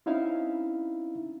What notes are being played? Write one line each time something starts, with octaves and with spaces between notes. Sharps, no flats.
C4 C#4 D#4 E4 E5 F5